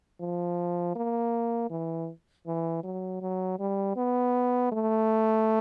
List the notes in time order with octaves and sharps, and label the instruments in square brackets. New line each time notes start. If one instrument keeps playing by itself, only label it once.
[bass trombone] F3
A#3
E3
E3
F#3
F#3
G3
B3
A3